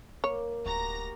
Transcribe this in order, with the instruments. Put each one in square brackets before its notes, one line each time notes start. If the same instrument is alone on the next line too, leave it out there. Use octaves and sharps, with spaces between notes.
[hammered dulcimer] A#3 [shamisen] C#5
[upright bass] D1 [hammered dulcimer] F#4 G4 [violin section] A#5 A#6